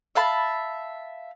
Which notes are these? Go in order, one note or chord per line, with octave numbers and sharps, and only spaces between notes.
E5 F5 A5 B5